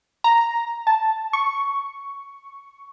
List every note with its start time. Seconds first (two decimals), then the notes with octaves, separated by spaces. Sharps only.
0.24 A#5
0.87 A5
1.33 C#6